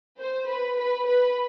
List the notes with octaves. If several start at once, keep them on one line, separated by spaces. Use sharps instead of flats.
C5
B4
B4
B4